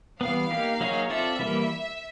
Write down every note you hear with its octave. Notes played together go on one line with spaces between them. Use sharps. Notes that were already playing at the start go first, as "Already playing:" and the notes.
E3 G3 B3 F5
A#3 D#4 G4
F#3 A#3 D#4 G#4 C#5
C4 F4 A4 D5 E5
E3 G3 A#3